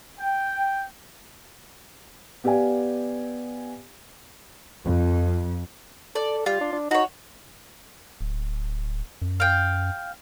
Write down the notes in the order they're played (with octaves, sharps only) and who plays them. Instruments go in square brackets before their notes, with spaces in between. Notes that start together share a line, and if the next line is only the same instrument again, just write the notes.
[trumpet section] G5
[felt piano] B3 G4 D5 F5 G#5
[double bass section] F2
[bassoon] A4 [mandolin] D5
[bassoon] G3 [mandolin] F4
[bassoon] D4
D4
[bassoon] D#4 [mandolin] F#4 C#5
[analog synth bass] D1
F#2
[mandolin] F5 G5